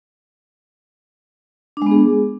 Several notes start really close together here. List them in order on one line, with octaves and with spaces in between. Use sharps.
D4 G#3 B3 G#4